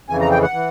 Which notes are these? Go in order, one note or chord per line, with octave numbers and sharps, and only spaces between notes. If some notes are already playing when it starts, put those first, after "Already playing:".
F2 C#3 E3 G#5
A#5
G5
F#5
E3